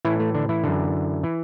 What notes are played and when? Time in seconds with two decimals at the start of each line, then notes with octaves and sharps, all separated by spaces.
0.05 A2 E3 E4
0.20 A3
0.35 D3 D4
0.49 E3 E4
0.64 F#2 D3
1.23 E3